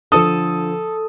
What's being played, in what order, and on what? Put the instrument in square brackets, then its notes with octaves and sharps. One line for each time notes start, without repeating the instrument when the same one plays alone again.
[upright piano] D3 F3 [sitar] A4 [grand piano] D#6